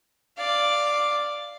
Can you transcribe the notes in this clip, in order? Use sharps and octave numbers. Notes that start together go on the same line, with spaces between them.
D5 F5